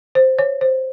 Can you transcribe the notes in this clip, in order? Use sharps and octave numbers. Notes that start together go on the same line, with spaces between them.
C5
C#5
C5